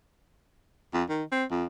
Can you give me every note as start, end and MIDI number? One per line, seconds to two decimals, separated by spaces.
0.94 1.03 41
1.09 1.23 51
1.32 1.44 60
1.51 1.65 41